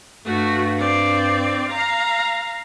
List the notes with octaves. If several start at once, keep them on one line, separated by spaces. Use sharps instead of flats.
G2 A3 F#4
C4 D5
F5 A#5